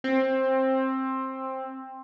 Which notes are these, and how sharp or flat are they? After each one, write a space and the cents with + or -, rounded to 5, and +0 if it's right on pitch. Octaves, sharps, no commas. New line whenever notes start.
C4 +15